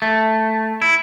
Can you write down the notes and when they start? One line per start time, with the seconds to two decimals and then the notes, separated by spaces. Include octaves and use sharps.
0.02 A3
0.82 E4